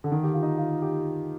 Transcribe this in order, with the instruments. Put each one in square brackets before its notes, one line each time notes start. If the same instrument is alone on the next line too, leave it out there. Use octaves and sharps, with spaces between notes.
[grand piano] D3
D#3
G4
F4
D#4
F4
G4